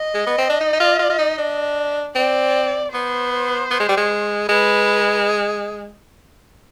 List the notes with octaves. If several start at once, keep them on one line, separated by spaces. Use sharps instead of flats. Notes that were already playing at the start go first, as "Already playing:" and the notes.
Already playing: D#5
G#3
B3
C4
D4
D#4
D#4
F4
F4
F4
D#4
D4
C4 D5
B3 C5
B3
G#3
G3
G#3
G#3 B4